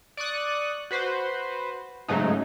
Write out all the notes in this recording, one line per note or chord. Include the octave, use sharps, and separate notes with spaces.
D5 C#6 D#6 F#6
F#4 B4 C5
G#2 C#3 F#3 A3 D#4